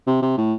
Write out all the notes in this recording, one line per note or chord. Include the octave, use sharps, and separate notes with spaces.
C3
C3
A2